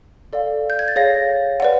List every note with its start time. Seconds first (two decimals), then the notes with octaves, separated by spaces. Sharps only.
0.33 A4 D5 F5
0.70 G6
0.79 G#6
0.88 A6
0.96 G#4 C#5 F5 A#6
1.60 B4 D5 F#5